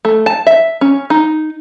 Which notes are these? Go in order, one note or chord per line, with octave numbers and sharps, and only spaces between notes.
A3
A5
E5
C#4
D#4